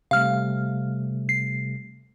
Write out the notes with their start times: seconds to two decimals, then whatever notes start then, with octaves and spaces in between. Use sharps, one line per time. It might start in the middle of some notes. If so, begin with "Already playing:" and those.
0.11 C3 G3 A3 F5 F6
1.29 C7